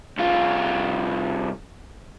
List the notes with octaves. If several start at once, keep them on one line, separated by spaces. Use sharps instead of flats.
C2 F4